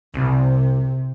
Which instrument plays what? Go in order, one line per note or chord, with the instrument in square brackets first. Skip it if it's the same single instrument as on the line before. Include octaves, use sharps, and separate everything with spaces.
[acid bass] C2 [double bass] C3